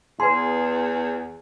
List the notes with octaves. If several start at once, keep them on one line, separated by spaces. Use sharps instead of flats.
E2 G#4 B4 C6